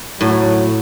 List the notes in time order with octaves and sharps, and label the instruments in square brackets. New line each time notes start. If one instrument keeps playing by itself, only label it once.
[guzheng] A2 [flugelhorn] F#3